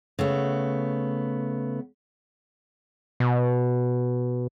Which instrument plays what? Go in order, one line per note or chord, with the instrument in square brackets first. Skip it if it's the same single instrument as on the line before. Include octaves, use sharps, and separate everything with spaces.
[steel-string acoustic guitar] C#3 A3 B3
[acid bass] B2